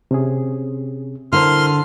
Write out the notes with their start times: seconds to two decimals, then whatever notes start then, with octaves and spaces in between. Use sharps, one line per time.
0.11 C3 C#4 G#4
1.33 D3 E4 A#4 C5 C6 F6